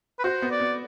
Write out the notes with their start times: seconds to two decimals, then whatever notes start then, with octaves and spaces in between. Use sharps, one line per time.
0.19 B4
0.24 F#4 C5
0.42 B3
0.51 D5
0.60 B3